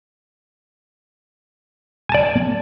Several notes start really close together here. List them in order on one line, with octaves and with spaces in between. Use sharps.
G#5 A5 D5